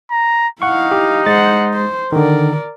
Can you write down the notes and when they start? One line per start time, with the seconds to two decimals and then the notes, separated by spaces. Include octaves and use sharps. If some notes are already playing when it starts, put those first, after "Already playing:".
0.11 A#5
0.62 D#4 E4 F5 F#5 C#6
0.91 G4
1.26 G#3 C5 F#5 A6
1.73 C5
2.12 D3 D#3 A#4 D5